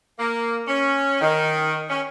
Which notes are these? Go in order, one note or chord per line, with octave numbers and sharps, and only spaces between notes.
A#3
C#4
D#3
C#4